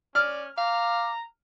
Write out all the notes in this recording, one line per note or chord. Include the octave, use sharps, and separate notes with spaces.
C#4 D5 F6
F5 A#5 D6